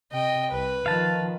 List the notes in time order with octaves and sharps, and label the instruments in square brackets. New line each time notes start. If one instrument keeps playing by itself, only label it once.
[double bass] C3 [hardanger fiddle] D#5 G5
[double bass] C2 [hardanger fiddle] B4
[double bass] D#3 F3 [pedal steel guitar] F5 A5